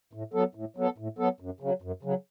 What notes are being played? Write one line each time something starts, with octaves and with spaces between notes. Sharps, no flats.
A2
F#3 B3 A4
A2
F#3 B3 A4
A2
F#3 B3 A4
F#2
C#3 F#3
F#2
C#3 F#3